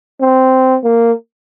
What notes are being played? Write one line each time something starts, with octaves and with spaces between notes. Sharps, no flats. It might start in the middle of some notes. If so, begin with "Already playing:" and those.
C4
A#3